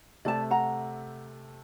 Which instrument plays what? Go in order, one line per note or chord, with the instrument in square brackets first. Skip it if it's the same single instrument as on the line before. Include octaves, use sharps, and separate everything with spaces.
[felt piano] C3 A3 [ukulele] D5 A5
[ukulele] F#5 A#5